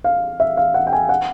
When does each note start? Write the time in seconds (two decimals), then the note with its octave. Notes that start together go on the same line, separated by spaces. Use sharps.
0.04 F5
0.40 E5
0.57 F5
0.74 F#5
0.87 G5
0.93 G#5
1.09 F#5